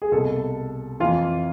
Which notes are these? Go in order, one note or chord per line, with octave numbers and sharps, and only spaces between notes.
G#4
C2 B2 A4
F2 E3 F4